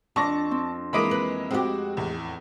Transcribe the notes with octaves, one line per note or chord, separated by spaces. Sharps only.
F2 D4 A5 C#6 A#6
C4
E3 G#3 A#3 B5 D6 D#6
B4
G#3 C4 F#4 G4
E2 A2